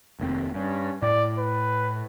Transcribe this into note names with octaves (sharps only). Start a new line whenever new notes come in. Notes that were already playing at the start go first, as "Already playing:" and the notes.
F1 D#2 C4
G2 C#4
A2 D5
B4